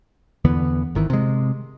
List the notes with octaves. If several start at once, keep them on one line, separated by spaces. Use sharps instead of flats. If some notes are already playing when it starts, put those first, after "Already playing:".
E2 D3 E3 B3
G#1 D#3 E3
C3 G#3